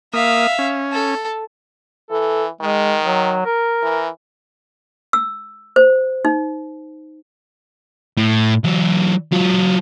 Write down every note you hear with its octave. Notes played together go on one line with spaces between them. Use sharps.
A#3 E5 F5 D#6
C#4
A4
E3 A4
D#3 G#3
F#3
A#4
E3
E6
C5
D#4
A2
E3 F#3
F#3 F4